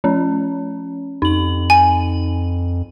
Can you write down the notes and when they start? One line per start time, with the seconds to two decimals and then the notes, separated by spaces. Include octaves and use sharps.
0.04 F3 C#4
1.22 F2 D#4 F#7
1.70 G#5